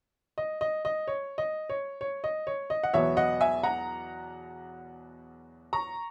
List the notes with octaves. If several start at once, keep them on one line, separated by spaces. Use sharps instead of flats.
D#5
D#5
D#5
C#5
D#5
C#5
C#5
D#5
C#5
D#5
F#5
E2 B2 F#3 B3 C#5 E5
D#5 F#5
E5 G#5
F#5 A#5
A#5 C#6